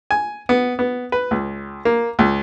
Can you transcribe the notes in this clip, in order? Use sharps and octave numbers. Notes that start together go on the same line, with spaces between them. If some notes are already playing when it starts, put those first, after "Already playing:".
G#5
B3
B3
B4
C#2
A#3
C#2